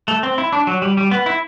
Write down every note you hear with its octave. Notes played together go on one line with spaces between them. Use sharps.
A3
C4
E4
D4
F#3
G3
G3
B3
E4